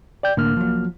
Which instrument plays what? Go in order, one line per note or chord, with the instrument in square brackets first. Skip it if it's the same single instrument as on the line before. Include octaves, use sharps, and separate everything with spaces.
[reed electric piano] D5 G5 G6
[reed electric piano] C2 A#3 F6 [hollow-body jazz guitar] A2 D3
[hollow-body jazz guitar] F3 F#3